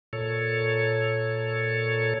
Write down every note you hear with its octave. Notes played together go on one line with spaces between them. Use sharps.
A#2 A4 C#5